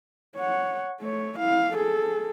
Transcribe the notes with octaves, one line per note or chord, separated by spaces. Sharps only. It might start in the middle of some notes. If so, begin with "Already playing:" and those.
C#5 F#5
A3 C#5
E4 F5
G#4 A4